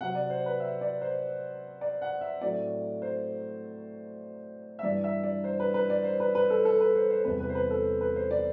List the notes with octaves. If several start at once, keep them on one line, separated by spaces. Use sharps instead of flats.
C3 F#3 C4 F#5
D5
C5
B4
E5
D5
C5
D5
F#5
E5
A2 F#3 A3 C4 D5
C5
E5
G2 E3 G3 D4 D5
E5
D5
C5
B4
B4
D5
C5
B4
B4
A4
A4
B4
C5
C5
E2 C3 G3 C4 B4
B4
C5
B4
A4
B4
C5
D5